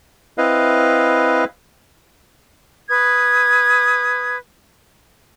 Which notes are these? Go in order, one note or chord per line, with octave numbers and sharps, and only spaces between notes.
C4 E4 B4 D#5 F5
B4 D#6 G#6